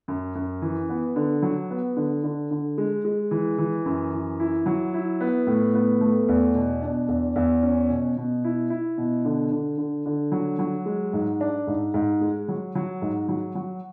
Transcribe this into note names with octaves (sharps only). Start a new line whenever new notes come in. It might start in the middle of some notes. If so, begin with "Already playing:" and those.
F#2
F#2
E3
B3
D3
F#3
B3
D3
D3
D3
G#3
G#3
E3
E3
F#2
E3
E4
F#3
E4
B3
A2
B3
A3
E2
B2
D4
E2
E2
C#4
B2
B2
E4
E4
B2
D3
D3
D3
D3
F#3
F#3
G#3
G#2
D4
G#2
G#2
G#3
F#3
F#3
G#2
F#3
F#3